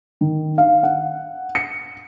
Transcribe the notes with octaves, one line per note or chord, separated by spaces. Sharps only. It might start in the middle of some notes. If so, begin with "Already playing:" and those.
D#3
F5
F#5
C#7